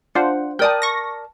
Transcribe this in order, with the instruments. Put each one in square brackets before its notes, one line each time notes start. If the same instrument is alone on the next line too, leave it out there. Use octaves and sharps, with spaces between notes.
[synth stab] D4 F4 C5 [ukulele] F#5
[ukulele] A#4 D5 A5 [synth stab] G5 D#6
[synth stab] C#6 A#6